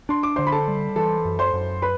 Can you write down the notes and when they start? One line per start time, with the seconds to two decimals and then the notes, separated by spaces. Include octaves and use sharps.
0.09 D4 C6
0.23 D6
0.36 D3 C5 C6
0.47 B5
0.52 A4 A5
0.68 G3
0.96 E3 A4 A5
1.25 F#2
1.39 C5 C6
1.54 F#2
1.82 B4 B5